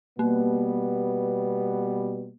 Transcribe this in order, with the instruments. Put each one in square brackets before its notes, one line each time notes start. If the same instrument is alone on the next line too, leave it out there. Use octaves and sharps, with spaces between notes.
[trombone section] B2 G3 B3 [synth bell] A#3